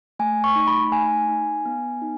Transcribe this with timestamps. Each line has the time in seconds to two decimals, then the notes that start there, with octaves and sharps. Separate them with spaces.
0.19 A3 G#5
0.44 C#6
0.56 D#4
0.67 B5
0.91 A3 G#5
1.29 D#4
1.65 B3
2.02 D#4